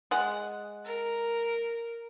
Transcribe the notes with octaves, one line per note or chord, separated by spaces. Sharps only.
G#3 F#5
A#4